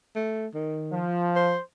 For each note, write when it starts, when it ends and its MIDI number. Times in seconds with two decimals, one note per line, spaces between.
0.16 0.47 57
0.54 1.04 51
0.91 1.55 53
1.36 1.60 72